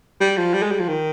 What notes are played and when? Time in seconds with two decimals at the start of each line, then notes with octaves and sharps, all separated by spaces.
0.20 G3
0.37 F3
0.53 G3
0.62 G#3
0.71 G3
0.79 F3
0.88 D#3